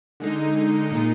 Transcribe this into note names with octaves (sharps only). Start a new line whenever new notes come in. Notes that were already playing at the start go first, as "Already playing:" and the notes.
D3 G#3 D#4
A#2 G#3 D#4